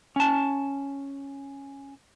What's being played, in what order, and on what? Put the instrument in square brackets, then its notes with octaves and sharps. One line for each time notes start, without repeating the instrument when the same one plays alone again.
[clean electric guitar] C#4 A5